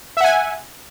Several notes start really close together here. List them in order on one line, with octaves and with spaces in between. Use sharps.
E5 F#5 G#5